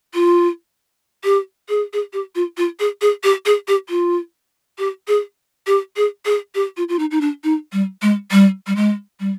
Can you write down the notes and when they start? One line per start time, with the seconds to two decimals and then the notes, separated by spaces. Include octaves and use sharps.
0.14 F4
1.24 G4
1.69 G#4
1.93 G#4
2.13 G4
2.35 F4
2.57 F4
2.80 G#4
3.01 G#4
3.24 G4
3.46 G#4
3.68 G4
3.89 F4
4.78 G4
5.08 G#4
5.67 G4
5.96 G#4
6.25 G#4
6.55 G4
6.77 F4
6.89 F4
6.99 D#4
7.11 D#4
7.21 D4
7.44 D#4
7.73 G3
8.02 G#3
8.31 G3
8.67 G3
8.76 G#3
9.20 G3